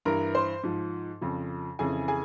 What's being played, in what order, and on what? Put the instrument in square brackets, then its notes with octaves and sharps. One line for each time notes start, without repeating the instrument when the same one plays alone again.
[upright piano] G2 E3 A#4 A#5
C5 C6
G#2 F3
F2 C#3 F3
F2 C#3 E3 G#4 G#5
G#4 G#5